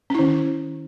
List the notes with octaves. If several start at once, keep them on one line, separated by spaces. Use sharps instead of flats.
D#3 C#4 E4